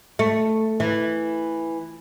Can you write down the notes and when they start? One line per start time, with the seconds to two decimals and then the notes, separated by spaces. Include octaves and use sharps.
0.19 A3
0.80 E3